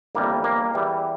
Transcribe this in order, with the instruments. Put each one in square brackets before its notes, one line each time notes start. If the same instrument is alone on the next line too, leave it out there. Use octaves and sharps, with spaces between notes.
[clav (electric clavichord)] G1 F2 E3 G3 A#3
A#3
E2 E3 G3